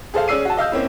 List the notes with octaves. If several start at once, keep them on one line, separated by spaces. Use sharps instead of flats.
G#4 A4 C5 F5
C#4 G#4 D5 E6 C7 D#7
F#4 A5
D#5 F5 E6 G6
A#3 C4 C#4 E4